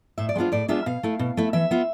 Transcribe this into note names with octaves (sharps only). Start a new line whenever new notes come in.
A2 E5
D5
G#3 B3 D4 F4 C5
A2 D5
G#3 B3 D4 F4 E5
B2 F5
A3 E4
B2
A3 E4
E3 E5
B3 F4